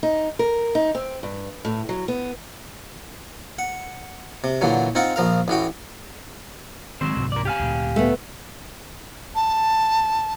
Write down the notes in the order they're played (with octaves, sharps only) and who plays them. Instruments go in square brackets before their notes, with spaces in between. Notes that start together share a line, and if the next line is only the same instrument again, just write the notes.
[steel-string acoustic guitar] D#4
A#4
D#4
C4
G2
A2
F#3
B3
[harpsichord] F#5
C3
A#2 D3 E3 F#3
C4 D#4 F4 F#5 G5
A#1 F3 A#4 F5
A1 E3 F#4 G5
[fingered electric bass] D#3 G#3 [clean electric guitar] F#3 C4 C5
[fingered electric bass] C2 G#2 C3
[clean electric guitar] A#4 D5
G4 F5 G#5
[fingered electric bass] D2 A#2
[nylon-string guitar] A3 B3
[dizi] A5